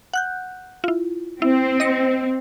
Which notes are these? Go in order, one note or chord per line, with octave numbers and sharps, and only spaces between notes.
F#5 F#6 G6
E4 F4
C4 E4
D#5 A#6 C#7